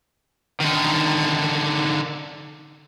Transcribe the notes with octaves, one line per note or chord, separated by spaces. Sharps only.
D3 D#3